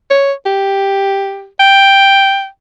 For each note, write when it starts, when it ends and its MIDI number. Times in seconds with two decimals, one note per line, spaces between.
0.11 0.32 73
0.46 1.47 67
1.60 2.46 79